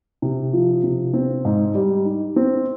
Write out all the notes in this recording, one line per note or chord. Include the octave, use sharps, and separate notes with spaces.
C3
F3
C3
C4
G#2
G3
D#4
C4